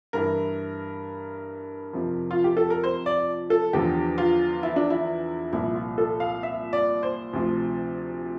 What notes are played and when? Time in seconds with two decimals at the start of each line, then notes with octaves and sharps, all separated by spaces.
0.13 G2 E3 A#4
1.93 F2 C3 F3
2.31 F4
2.44 G4
2.57 A4
2.70 A#4
2.84 C5
3.06 D5
3.50 A4
3.73 E2 D3 F3 G4
4.18 F4
4.63 E4
4.76 D4
4.90 E4
5.53 C2 A#2 F3 E4
5.75 F4
5.98 A4
6.20 F5
6.43 E5
6.73 D5
7.03 C5
7.33 D2 C3 F3